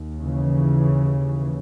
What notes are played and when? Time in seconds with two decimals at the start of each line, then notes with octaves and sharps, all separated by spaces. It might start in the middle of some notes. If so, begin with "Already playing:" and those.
Already playing: D#2
0.20 C#3 E3